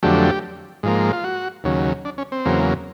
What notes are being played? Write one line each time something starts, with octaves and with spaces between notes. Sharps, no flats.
F2 D3 F#3 A3 G4
G#2 F3 A#3
F4
F#4
D#2 C#3 F#3
D4
C#4
C4
E2 C#3 F#3 A#3